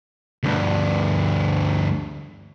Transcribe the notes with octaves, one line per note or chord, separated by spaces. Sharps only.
D2 G2